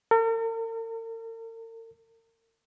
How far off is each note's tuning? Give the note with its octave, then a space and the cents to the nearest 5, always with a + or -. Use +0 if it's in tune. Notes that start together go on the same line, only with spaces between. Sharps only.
A#4 -45